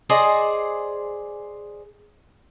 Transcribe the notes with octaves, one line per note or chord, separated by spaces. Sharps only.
G#4 C5 D5 D#5